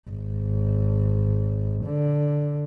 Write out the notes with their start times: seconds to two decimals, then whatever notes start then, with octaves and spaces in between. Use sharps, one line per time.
0.10 G#1
1.85 D3